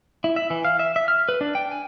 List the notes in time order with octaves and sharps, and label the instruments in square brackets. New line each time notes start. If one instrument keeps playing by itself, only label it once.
[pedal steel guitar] E4
E5
E3
F5
E5
E5
F6
B4
D4
G5
G#5